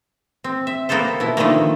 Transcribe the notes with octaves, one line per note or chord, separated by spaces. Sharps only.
C4
E5
A#3 B3 G4 A4 C5
B2 E4
D3 D#3 F3 G3 A3 A#3